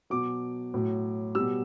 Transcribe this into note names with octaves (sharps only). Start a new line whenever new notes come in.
B2 F#3 D6
A2 F#3
B2 G3 E6